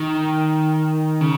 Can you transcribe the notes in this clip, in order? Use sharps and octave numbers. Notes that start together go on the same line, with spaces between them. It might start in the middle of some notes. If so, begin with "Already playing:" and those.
Already playing: D#3
C#3